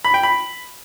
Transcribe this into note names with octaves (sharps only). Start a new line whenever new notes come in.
B5
G5
B5